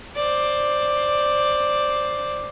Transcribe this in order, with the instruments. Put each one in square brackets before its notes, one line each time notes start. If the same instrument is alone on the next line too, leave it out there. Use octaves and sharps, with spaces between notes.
[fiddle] C5 D5